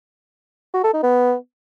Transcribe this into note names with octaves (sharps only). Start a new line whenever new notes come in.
F#4
A4
D#4
B3